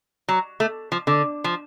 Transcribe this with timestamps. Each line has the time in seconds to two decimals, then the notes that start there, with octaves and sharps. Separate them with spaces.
0.29 F#3
0.60 A3
0.92 F3
1.07 D3
1.44 F3